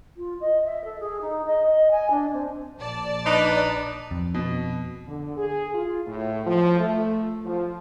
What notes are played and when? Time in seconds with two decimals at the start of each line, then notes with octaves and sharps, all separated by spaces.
0.17 F4
0.40 D#5
0.65 E5
0.84 A4
1.00 G#4
1.21 D#4
1.46 D#5
1.67 D#5
1.91 G#5
2.11 D4
2.33 C4
2.79 A#1 D5 A5
3.25 D4 D#4 B4
4.11 F2
4.34 B2
5.08 D3
5.37 G#4
5.75 F4
6.07 A2
6.47 F3
6.79 A3
7.45 F3